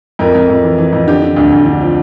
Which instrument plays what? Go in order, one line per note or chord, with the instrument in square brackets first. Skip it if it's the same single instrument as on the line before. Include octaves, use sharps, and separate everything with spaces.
[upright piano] F2 A#4
F2
F2
E3
E3
F2
D3 G4
D3
D2
D2
D3
F3